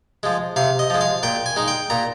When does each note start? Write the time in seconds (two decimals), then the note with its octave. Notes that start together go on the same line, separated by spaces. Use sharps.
0.23 F3 G#3
0.56 C3 F5
0.79 D#5
0.90 F3 G#3
1.01 F5
1.23 A#2 G5
1.46 G#5
1.56 G#3 D#4
1.68 G5
1.90 A#2 A#5